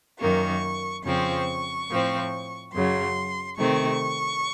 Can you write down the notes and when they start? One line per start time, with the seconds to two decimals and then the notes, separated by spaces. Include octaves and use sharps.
0.20 F#2 D#3 A#3 C#6
1.04 F2 C#3 F3 C4 C#6
1.89 A2 F3 C4
2.72 F#2 C#3 F#3 C6
3.56 C3 D#3 A3 C4 C#6